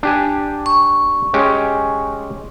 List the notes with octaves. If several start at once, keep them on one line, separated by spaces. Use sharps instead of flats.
D4 G4 G#5
C#6
G#3 C#4 G4